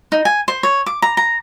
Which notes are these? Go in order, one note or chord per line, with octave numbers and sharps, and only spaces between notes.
D#4
G#5
C5
C#5
D6
A#5
A#5